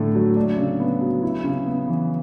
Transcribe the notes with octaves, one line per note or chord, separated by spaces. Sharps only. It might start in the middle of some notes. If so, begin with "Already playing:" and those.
Already playing: A2 D3 A3 D4
F#3
D4
C#3
B3
F#3
E4
C#3
B3
E3